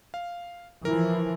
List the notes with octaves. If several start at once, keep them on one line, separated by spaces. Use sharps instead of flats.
F5
E3 F3 A#4